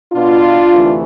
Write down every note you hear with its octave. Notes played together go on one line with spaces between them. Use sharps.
B2 B3 D4 F4
D2 C3 E3 A3